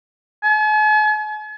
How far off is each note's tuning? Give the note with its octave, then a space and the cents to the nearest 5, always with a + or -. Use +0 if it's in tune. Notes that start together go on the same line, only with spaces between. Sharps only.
G#5 +45